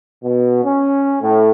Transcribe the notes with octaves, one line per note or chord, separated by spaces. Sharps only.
B2
C#4
A2